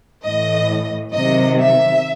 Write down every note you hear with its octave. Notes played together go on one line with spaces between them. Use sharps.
A2 E3 D#5
C3 D#3 F#3 D#5
E5